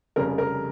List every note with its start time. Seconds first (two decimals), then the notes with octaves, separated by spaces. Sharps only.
0.16 F1 F2 C#3 G3 C#4 A#4
0.38 A#4